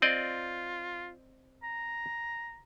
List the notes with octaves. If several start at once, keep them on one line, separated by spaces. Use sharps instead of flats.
C4 F4 D5 D#5
A#5